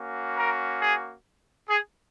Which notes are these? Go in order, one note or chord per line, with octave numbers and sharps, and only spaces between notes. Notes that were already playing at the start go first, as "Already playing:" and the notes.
Already playing: A#3 C#4 F#4
A#4
G#4
G#4